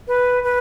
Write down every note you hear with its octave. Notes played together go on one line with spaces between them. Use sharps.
B4
B4